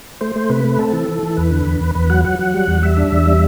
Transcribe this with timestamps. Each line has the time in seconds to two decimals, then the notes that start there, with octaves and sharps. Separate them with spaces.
0.21 A3 C5
0.36 A3
0.50 C3 B4
0.64 A3
0.79 C4 A4
0.93 E3
1.08 E3
1.23 E3
1.37 E2 B4
1.51 D3
1.66 E2
1.81 E2
1.95 E2 B4
2.10 F#3 F#5
2.25 F#3 F#5
2.39 F#3
2.54 G3
2.68 E2
2.82 G3 E5
2.97 D4
3.12 E2
3.26 G3